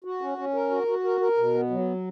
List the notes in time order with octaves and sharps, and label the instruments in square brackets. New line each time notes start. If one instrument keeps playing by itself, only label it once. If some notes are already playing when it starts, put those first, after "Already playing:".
[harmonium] F#4
C#4
C#4
A#4
F#4
F#4
A#4
A#4
B2
B3
F#3